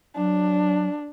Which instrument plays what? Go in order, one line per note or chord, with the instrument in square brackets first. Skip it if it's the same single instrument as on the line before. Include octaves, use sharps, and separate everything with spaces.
[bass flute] F#3 [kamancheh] D4